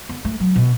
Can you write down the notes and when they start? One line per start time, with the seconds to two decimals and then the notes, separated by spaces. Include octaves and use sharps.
0.09 B3
0.25 A3
0.40 F#3
0.56 B2